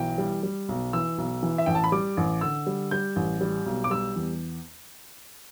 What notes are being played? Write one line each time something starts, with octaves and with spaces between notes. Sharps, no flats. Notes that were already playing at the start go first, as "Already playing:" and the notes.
Already playing: B1 E3 G5
G3
G3
B1
E3 E6
B1
E3
E5
A1 G5
A5
B5
G3 D6
A1
D3 E6
G3
G3 G6
A1
G3
B1
D6
G3 E6
E2